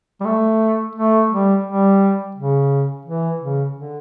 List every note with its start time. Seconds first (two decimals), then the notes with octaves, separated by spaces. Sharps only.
0.20 G3
0.25 A3
0.95 A3
1.30 G3
1.65 G3
2.35 C#3
3.05 E3
3.40 C#3
3.75 D3